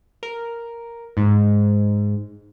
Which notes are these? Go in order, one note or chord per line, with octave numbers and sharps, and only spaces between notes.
A#4
G#2